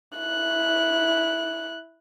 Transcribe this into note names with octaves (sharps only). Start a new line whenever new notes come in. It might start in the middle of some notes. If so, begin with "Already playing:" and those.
E4 F#6